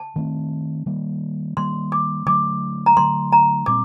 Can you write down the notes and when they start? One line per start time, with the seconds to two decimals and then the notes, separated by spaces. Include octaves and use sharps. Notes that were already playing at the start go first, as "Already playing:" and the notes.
Already playing: A5
0.16 D#3 A3 C4
0.86 D#3 G3 A#3
1.57 D#3 G3 A#3 C6
1.92 D6
2.26 D3 F#3 A3 D6
2.86 A#5
2.97 D3 F#3 A3 C6
3.32 A#5
3.66 A#2 G3 C4 D6